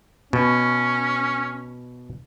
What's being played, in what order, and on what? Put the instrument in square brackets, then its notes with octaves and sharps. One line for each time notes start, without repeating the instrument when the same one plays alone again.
[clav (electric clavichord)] B2 [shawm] C#4